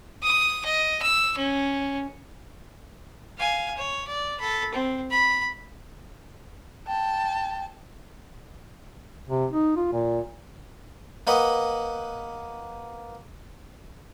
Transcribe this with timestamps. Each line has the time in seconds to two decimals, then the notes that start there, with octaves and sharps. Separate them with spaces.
0.23 D#6
0.65 D#5
1.02 E6
1.37 C#4
3.38 F5 G#5
3.77 C#5
4.08 D5
4.40 A4 B5
4.74 C4
5.11 B5
6.87 G5 A5
9.28 C3
9.51 D#4
9.76 F4
9.93 A#2
11.27 A#3 B4 D#5 F#5